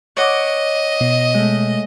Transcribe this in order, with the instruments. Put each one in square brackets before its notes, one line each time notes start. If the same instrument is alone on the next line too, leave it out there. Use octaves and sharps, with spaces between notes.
[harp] C#5 F#5 D6 [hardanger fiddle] D#5
[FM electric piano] B2
[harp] G#3 A3